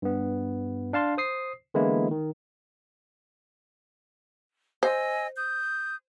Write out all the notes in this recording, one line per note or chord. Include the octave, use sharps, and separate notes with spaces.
G2 B3
D4 F5 A5 C6
C5 D#6 C7
D3 E3 G#3 A#3 B3 E4
D#3
C5 D#5 G#5 E6
D#6 G6